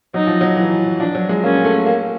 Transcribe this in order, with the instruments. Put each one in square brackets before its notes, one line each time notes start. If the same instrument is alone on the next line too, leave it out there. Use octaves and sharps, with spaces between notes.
[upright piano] F#3 [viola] D#4
[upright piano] F3
F#3
E3
[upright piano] F3 [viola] D4
[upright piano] F#3
G#3
[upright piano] A#3 [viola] C#4
[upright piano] A3
A#3